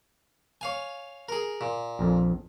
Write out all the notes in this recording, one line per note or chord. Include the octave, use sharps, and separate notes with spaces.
C#5 F5 G#5
G#4 A#4
A#2
A#1 F2